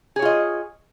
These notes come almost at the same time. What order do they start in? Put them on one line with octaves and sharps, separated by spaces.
G#4 C#5 F4 D#5